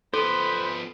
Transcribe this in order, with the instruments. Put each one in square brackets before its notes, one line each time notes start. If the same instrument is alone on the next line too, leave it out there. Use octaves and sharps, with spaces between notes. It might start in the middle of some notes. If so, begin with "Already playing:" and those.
[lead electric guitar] F3 B3 [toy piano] A4 [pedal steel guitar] C5 [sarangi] B5